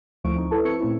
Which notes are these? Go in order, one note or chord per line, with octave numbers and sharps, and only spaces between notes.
D2 F3 A3 E4 C#6 D7
C4 D#4
E4 A4 B4 A5
C4 E4 C#6 E6 G#6 C#7
A#2 A3 C4 C#4 E4